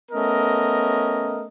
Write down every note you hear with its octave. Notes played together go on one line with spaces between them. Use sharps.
A3 B3 C#4 A#4 D#5